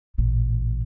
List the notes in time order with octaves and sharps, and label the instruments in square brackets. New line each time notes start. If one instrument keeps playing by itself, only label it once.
[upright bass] A1 A#2